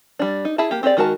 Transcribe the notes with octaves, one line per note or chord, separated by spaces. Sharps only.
G3 D4
D#4
E4 G#4 E5 A5
A#3 G4
C4 G4 G#4 C#5 D5
D#3 G#3 F#4 A#4 A5